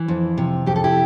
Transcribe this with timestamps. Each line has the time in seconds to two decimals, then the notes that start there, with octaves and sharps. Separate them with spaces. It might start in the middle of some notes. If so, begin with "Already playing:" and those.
Already playing: E3
0.08 F2
0.38 C3
0.66 F2 G4
0.76 A4
0.84 E4 G4